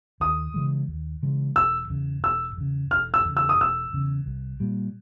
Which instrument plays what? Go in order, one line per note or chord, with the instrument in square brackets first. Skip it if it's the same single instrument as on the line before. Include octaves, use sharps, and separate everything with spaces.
[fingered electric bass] D#2 [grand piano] D#6
[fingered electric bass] C#3 E3 G#3
D#2
C#3 E3 G#3
[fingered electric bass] E1 [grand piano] E6
[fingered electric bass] E2 C#3
[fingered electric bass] E1 [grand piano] E6
[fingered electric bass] E2 C#3
[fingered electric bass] E1 [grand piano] F6
[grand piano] E6
[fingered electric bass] E2 C#3
[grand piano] E6
D#6
[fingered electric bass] E1 [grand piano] E6
[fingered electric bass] E2 C#3
C2
A#2 G3